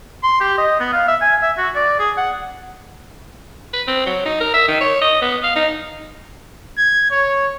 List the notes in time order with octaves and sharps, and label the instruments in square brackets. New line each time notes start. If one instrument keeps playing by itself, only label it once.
[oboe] C6
G4
D#5
B3
F5
E5
G#5
E5
F#4
D5
G#4
F#5
[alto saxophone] B4
C4
F#3
D#4
A#4
E5
D#3
C#5
D#5
B3
F5
D#4
[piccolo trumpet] G#6
C#5